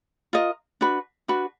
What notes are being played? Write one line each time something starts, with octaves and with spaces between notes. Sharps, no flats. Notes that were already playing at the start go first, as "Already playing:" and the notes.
F4 A#4 D#5
D4 F#4 B4
D4 F#4 B4